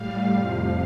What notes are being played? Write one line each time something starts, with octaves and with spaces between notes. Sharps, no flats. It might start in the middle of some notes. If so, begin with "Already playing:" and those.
Already playing: A2 G3 F5
F2 C3 F3